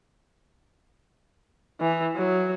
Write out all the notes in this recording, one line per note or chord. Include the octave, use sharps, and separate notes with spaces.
E3
F#3